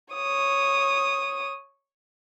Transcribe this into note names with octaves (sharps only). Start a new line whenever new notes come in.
C#5 D#6